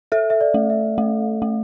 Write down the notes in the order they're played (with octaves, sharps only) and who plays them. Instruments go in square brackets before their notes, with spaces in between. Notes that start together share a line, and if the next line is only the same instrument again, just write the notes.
[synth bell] A4 [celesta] E5
[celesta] E5
D5
[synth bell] A3
[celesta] E5
[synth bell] A3
A3